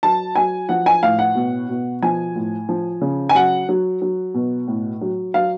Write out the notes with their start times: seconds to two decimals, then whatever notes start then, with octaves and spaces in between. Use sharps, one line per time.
0.03 F#3 A5
0.36 F#3 G#5
0.69 F3 F#5
0.86 G#5
1.03 A2 F5
1.19 F#5
1.35 B2
1.69 B2
2.02 F3 G#5
2.35 A2
2.69 F3
3.01 C#3
3.29 G#5
3.35 F#3 F#5
3.69 F#3
4.02 F#3
4.34 B2
4.68 A2
5.01 F#3
5.34 F#3 F5